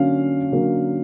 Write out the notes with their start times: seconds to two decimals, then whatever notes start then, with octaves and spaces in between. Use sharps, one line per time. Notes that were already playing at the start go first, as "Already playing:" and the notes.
Already playing: D3 F#3 A#3 C#4 F5
0.52 D3 F#3 A#3 C#4